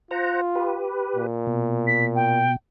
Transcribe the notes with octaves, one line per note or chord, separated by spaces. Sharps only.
F4 C5 F#5 A#5
G4 B4
A#2
B2
B6
G5